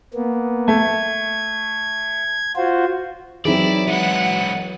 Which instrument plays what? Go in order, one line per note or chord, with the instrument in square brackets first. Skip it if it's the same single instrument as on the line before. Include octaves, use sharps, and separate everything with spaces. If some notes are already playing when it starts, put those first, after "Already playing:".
[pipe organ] A#3 B3
[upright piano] A3 [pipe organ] G#6
[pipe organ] F4 F#4 C5
[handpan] E3 F#3 [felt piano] C4 D#4 G#4 [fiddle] E4 [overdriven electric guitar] D5
[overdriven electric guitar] G#3 B3 [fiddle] F#5